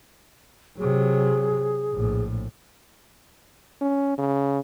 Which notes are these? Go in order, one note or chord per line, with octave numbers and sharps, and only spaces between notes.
C3 F#3 G#4
A#1 A2
C#4
C#3